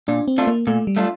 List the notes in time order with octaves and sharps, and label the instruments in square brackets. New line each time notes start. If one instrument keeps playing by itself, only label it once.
[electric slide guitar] A#2 [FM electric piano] D4
[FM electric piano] C4
[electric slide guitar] A3 D4 F4
[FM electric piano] A#3
[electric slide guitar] A#2 [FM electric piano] A3
[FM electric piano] G3
[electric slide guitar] A3 D4 F4